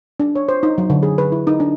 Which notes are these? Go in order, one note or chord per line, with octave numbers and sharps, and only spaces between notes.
D4
C#5
C5
D#4
F#3
D3
G#4
B4
E4
D#4
D4